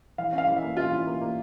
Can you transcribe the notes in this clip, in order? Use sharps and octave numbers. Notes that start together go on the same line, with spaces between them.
E3 F5
C#4
F5
E3
E5
A#3
C#4 F4
E3
A#3
A#3